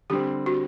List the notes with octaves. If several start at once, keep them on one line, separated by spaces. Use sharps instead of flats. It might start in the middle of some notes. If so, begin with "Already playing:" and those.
D3 G3 C4 G4
F#4